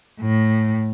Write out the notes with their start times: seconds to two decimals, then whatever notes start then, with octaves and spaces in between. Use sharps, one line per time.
0.21 A2